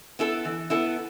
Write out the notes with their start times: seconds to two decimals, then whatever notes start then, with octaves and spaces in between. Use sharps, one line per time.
0.19 B3 E4 A4
0.45 E3
0.70 B3 E4 A4